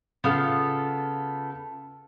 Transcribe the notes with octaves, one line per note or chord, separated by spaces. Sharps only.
C#3 B3 F4 A4